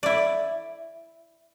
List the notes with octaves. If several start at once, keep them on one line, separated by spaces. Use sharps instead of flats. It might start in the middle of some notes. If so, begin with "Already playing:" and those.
E4 D5